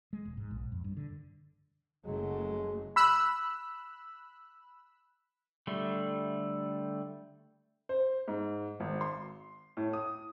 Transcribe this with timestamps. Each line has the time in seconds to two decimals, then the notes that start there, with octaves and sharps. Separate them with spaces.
0.13 G#3
0.25 E1
0.37 G#2
0.51 A#1
0.72 F2
0.84 G2
0.97 D3
2.05 F#1 F#3 G#3 A3
2.96 B5 E6 F#6
5.67 D3 G3 A3
7.89 C5
8.28 G#2
8.80 G#1
9.01 C6
9.77 A2
9.93 D#6